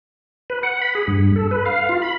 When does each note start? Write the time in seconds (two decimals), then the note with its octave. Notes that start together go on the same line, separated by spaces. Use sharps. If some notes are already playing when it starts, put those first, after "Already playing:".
0.50 B4
0.63 F#5
0.81 B5
0.95 G#4
1.07 G2
1.36 A4
1.51 B4
1.66 F5
1.89 F4
2.02 B5